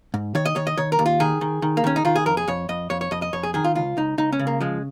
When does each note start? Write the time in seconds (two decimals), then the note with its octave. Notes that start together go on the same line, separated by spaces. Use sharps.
0.14 G#2
0.35 D#3 C#5
0.45 D#5
0.56 D#3 C#5
0.67 D#5
0.77 D#3 C#5
0.92 A#4
0.99 D#2
1.06 F4
1.20 D#3 G#4
1.41 D#3
1.62 D#3
1.77 A#3
1.84 D#3 C#4
1.96 D#4
2.05 D#3 F4
2.16 G#4
2.26 F2 A#4
2.37 G#4
2.48 F2 C#5
2.69 F2 D#5
2.90 F2 C#5
3.01 C#5
3.11 F2 D#5
3.22 D#5
3.33 F2 C#5
3.43 G#4
3.54 D#3 G#4
3.64 F4
3.75 C#2 F4
3.97 C#2 D#4
4.18 C#2 D#4
4.32 C#4
4.39 C#3
4.47 A#3
4.61 F3 G#3